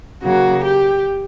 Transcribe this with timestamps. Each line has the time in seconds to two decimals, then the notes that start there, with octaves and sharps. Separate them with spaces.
0.23 C#3 F#3 A#3 F#4
0.64 G4